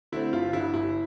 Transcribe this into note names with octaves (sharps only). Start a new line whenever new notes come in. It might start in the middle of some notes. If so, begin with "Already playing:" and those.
D3 A3 C4 E4
G1 F4
G2 D3 E4
G1 E4